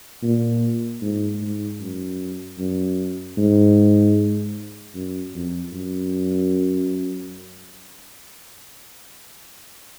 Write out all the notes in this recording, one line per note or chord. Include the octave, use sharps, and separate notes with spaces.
A#2
G#2
G#2
F#2
F#2
G#2
F#2
F2
F#2